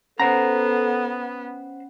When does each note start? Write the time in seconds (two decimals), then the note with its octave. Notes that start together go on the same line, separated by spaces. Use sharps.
0.20 B3 C#4 A4 C5 F#5 A#5